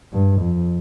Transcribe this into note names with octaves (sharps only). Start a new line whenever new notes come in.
G2
F2